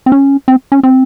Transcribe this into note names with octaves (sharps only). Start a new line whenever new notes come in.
C4
C#4
C4
C#4
C4